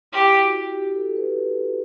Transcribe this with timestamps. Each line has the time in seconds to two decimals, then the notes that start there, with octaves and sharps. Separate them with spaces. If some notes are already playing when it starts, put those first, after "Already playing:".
0.12 E4 G4
0.40 F#4
0.67 G4
0.95 A4
1.16 B4